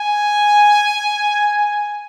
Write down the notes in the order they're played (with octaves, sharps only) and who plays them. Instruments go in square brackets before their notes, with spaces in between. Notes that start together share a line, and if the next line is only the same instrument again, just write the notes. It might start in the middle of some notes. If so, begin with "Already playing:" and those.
Already playing: [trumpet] G#5